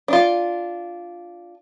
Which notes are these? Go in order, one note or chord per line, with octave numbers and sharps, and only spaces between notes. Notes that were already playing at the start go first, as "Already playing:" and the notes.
D4 F4